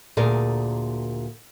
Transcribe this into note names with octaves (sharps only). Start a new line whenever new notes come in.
D2 A#2 G#4 A#4 D5